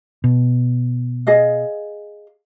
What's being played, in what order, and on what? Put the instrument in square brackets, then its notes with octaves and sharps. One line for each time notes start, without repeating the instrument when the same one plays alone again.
[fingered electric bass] B2
[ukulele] G#4 D#5 F5